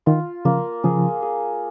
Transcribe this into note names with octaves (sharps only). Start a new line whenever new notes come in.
D#3 F4
C#3 F3 A#3
C#3 F3 G#4
G#4